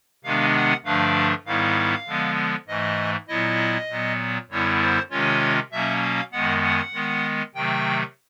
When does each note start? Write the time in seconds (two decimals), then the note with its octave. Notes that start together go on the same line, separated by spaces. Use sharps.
0.24 C3 D#3 G#3 B3 D4 F5
0.55 F#5
0.85 G2 D3 F3 A3 D4 F5
1.46 G#2 D#3 G3 B3 E4 F5
2.07 D3 F3 G#3 B3
2.68 G#2 E3 A3 D#5
3.28 A#2 F#3 B3 E4 D#5
3.89 A#2 F#3 B3
4.50 F#2 D3 G3 B3 E4 C#5
4.81 C5
5.11 C3 D#3 G#3 C#4 F4 C#5
5.72 B2 F#3 A#3 C#4 E5
6.03 F5
6.32 F#2 D#3 G#3 B3 F#5
6.63 F#5
6.93 D#3 G#3 B3
7.55 C3 D#3 F#3 A3 G5